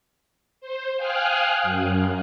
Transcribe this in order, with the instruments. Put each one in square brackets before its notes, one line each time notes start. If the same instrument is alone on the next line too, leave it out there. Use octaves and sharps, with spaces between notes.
[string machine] C5
F5 G5 G#5 D#6 F6 F#6
F#2